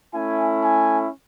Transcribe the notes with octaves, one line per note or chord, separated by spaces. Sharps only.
A3 C#4 E4 G#5
G#5